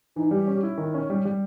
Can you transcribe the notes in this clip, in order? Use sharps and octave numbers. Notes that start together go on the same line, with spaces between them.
E3 D#4
G3 G4
C#4
E4
D#3
C#4
G3
G3